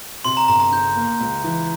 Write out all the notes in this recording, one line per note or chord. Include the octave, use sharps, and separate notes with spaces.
C3 C6
A#5
G1 A#5
A#5
C#3 G6
A#3
C#2
E3